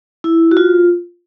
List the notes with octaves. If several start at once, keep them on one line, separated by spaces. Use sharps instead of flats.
E4
F#4
F4